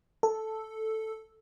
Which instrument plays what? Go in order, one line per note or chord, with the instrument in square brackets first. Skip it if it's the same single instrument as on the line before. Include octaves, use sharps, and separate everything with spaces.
[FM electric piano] A4